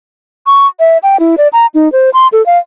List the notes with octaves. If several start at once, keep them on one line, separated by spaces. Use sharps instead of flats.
C#6
E5
G5
E4
D5
A#5
D#4
C5
C6
A4
F5